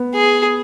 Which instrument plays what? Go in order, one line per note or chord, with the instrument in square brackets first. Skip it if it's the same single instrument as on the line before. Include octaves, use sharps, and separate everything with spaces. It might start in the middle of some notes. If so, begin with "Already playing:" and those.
Already playing: [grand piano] B3
[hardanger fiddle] G#4